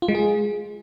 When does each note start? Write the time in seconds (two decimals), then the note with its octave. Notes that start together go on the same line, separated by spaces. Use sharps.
0.02 F4
0.08 G#3
0.15 G#4